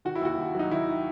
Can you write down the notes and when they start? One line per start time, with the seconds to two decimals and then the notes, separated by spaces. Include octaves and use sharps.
0.05 D#3 F#4
0.15 E4
0.22 D#2 F#4
0.38 D#2
0.55 F#3 D#4
0.71 D#3 E4